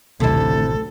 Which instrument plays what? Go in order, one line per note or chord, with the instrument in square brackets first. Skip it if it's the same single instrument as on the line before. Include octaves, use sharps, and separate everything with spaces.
[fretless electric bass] A1 D#3 F#3 [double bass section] D2 [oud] C3 E4 [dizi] A4